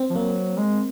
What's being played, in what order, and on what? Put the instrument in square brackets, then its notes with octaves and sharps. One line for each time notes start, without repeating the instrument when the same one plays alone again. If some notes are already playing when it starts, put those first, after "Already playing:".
Already playing: [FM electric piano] C4
[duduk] F3
[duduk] F#3 [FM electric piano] A#3
[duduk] G#3